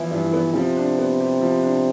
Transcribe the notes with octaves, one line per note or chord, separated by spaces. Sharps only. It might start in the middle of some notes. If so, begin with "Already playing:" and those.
Already playing: E3 F3 B3 E4
G2
B3
C3 F3
D4
B3
G4
F3
D4